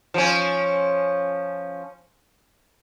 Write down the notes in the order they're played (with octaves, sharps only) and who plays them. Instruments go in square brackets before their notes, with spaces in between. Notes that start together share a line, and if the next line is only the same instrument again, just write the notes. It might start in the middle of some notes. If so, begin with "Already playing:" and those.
[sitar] F3 C#4